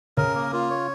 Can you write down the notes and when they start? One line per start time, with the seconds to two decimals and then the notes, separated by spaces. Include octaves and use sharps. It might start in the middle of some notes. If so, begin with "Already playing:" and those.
0.17 C#3 C#4 A#4
0.35 A#3
0.53 F4
0.70 C#5